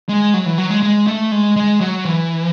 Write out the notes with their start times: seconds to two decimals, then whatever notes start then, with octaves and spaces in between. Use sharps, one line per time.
0.09 G#3
0.34 F#3
0.46 E3
0.58 F#3
0.70 G#3
0.83 G#3
1.07 A3
1.32 G#3
1.56 G#3
1.81 F#3
2.05 E3